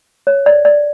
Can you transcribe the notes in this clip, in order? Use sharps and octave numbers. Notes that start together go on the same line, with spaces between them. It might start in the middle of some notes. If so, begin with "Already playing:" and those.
C#5
D5
D5